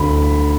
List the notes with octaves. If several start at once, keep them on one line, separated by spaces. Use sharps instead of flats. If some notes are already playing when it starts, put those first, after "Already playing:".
Already playing: D2 B5